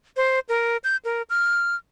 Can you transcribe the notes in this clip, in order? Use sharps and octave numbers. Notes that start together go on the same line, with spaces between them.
C5
A#4
G6
A#4
F6